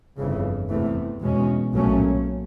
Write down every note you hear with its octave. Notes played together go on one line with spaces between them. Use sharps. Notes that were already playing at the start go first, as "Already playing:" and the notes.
G1 F2 C#3 E3
E2 C3 E3 A3
E2 B2 G#3 C#4
B1 A#2 F#3 A3 C#4